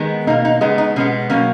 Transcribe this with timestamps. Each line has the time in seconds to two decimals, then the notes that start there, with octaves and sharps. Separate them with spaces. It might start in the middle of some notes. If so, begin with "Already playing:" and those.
Already playing: D#3 G#3 B3
0.27 B2 D#4
0.30 A#3
0.45 D#4
0.61 C#3 G#3 B3 D#4
0.78 D#4
0.96 B2 G#3 B3 C#4
1.30 B2 F#3 A#3 C#4